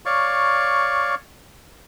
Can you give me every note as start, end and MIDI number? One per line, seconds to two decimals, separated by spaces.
0.06 1.15 73
0.06 1.15 74
0.06 1.15 77
0.06 1.15 85